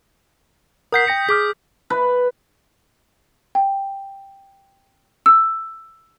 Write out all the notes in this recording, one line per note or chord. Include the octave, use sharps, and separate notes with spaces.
A#4 F#5 D#6 G6 B6 C7
G5 A#6 C#7
G#4 D6 F6 B6
B4
G5
E6